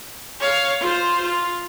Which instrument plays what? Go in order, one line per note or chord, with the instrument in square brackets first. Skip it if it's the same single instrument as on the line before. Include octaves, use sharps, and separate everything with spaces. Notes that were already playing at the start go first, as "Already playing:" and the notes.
[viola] C#5 F5
F4 C5
F4